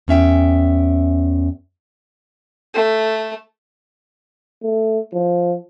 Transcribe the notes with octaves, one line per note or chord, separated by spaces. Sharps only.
E2 C#4 E5 G5
A3
A3
F3